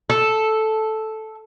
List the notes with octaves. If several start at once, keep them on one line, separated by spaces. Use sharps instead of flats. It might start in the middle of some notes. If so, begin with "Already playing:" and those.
A4